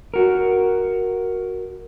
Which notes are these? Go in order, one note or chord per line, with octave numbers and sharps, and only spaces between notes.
F#4 A#4